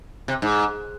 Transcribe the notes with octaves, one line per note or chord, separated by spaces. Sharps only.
C3
G#2